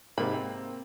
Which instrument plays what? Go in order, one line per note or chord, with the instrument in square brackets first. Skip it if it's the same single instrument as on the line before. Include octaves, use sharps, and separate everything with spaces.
[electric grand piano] G#2 C3 [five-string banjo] A#3 B5
[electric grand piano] C4